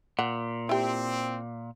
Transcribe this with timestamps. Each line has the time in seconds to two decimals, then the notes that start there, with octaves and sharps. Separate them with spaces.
0.19 A#2 F#5
0.69 C4 E4 G4